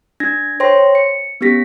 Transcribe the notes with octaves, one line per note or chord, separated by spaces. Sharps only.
D4 G#6 A#6
C5 C#5 G5 C6 A#6
C#7
B3 C#4 G4 A#6 B6